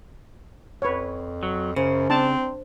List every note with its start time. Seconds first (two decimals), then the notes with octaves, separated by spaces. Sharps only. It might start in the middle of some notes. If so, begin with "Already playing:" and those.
0.82 F2 B4 C#5
1.43 F#3
1.76 F#2 C#3 C5
2.10 C4 D4 A5